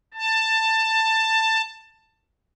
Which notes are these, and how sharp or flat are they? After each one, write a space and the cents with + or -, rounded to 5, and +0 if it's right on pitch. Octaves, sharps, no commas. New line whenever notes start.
A5 +15